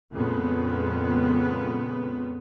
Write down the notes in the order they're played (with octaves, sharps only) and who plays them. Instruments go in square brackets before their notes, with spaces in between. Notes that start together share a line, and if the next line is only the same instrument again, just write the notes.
[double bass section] F2 A#2 C#3 G#3 B3